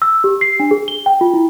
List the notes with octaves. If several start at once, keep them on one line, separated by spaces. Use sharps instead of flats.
E6
G4
C7
D4
G#4
G7
G5
F4
E4